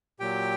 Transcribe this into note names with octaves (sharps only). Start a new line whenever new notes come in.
A#2 F#3 G4 G5